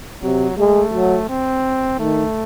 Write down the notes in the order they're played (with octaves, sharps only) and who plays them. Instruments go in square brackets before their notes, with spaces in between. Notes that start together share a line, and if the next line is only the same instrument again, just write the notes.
[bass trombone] C3 [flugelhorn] F#3
[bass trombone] G#3 [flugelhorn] A3
[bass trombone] F#3
[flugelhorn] C4
[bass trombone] D#3 [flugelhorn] A3